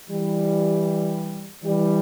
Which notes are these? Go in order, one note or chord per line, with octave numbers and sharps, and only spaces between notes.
E3 G3
E3 G3